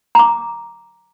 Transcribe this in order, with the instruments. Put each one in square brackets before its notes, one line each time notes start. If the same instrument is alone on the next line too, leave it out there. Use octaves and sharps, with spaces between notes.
[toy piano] A#5 D6